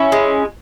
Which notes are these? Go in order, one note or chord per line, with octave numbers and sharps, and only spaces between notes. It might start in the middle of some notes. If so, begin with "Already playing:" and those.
Already playing: C#4 E4
G#3